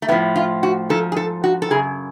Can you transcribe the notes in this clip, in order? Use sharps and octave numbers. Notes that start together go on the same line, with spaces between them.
A3
A2 F3 B3
F4
F#4
G#2 F3 A4
G#4
A4
F#4
A4
F#2 C#3 G#4